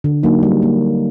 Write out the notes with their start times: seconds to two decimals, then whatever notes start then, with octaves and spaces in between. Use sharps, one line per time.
0.04 D3
0.23 F#3 A#3 D#4
0.43 G3
0.62 A#3